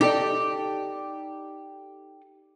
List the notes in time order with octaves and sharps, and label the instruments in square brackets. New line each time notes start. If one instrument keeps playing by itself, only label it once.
[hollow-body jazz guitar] D#4 A4 D5 [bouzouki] G4